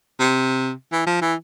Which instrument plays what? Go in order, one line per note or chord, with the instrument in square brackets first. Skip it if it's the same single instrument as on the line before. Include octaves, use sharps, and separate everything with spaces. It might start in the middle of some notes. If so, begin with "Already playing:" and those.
[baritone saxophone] C3
E3
F3
E3